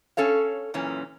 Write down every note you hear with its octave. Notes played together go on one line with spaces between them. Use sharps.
C#4 A4 C#5 F5
F#2 A#2 E3 C#4